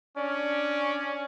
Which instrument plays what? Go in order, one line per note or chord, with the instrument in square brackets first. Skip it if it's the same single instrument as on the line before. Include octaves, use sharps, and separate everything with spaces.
[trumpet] C#4 [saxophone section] D4 D5